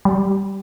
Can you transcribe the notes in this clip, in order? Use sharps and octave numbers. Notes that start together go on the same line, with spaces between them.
G3